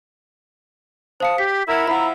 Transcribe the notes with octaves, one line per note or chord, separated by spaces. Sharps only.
C5 F5 A5 D#6 C#7
G4 B6
E4 A#4 F#5 G#6
F3 C4 E4 F#5 A#5 B5